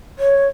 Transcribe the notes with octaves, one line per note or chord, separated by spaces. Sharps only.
C#5